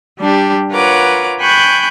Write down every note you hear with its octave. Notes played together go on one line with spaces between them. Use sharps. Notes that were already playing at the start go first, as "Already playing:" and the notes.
G3 D4 G4
F4 A#4 B4 C#5 F#5 D6
G5 G#5 B5 C#6 F#6 G6